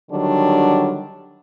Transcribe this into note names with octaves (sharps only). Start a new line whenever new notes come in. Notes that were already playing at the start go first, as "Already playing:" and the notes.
D3 D#3 F#3 G3 D4